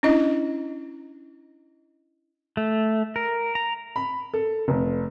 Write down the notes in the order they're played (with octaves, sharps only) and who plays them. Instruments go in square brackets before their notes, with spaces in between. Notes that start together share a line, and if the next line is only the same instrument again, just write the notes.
[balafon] C#4 D4 E4 D#5
[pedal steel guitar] A3
A#4
A#5
[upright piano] B5
A4
F1